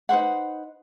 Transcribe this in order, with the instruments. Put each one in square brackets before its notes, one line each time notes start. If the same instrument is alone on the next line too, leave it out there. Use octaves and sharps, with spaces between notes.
[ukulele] D#4 B4 C5 F#5